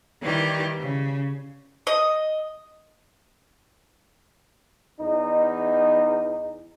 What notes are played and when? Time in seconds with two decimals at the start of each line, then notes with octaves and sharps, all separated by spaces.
0.21 D#3 E3 G3 G4
0.79 C#3
1.87 D#5
5.00 E2 D#4